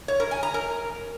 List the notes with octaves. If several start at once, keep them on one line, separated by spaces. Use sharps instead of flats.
C#5
A#4
G#5
A#5
A#4